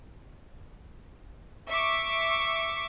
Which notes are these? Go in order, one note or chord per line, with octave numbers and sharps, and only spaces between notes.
E5 C#6 D6